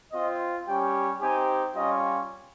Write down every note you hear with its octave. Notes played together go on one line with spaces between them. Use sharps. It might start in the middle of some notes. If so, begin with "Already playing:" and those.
C4 F4 D#5
G3 C#4 G4 G5
C4 D#4 G4 G#5
G3 C#4 F4 D#5